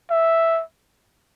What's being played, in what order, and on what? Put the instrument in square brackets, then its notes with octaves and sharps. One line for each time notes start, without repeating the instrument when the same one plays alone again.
[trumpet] E5